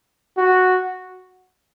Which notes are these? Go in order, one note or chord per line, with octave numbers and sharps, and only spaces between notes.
F#4